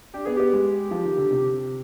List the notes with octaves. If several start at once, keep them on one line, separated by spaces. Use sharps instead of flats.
D4 G4
B3 G#4
B3 G4
G#3
F3
D#3
D3
C3